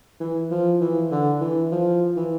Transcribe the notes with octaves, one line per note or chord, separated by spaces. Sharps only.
E3
F3
E3
D3
E3
F3
E3